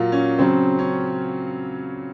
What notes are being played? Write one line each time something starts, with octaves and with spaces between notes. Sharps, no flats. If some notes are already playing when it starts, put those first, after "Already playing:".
Already playing: A#2 F#3 F4
C#4
C#3 F#3 C4
C#4